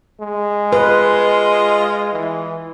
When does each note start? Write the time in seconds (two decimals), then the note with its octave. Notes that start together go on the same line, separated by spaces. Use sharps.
0.20 G#3
0.73 F4 B4 D#5
2.13 E3